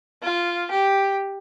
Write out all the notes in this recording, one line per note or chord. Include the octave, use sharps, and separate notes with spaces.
F4
G4